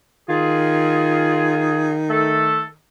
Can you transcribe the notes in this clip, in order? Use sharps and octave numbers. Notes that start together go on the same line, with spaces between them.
D#3 F4 G#4
A3 A4